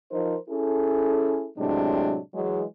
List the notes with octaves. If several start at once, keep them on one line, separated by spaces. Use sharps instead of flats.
F3 D#4 A#4 C5
C#4 E4 G#4 A4
A2 C3 F#3 G#3 D4
E3 F#3 G#3